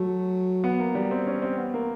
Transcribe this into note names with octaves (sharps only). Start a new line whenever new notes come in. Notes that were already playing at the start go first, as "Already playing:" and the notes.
Already playing: F#3 A3
B3
A#3
G3
C4
C#4
C4
B3
A#3